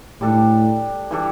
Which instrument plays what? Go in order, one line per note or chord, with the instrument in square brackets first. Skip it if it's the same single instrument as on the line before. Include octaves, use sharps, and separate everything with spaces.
[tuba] A2 [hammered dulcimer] G3 D4 A4
[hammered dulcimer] E3 G3 D4 A4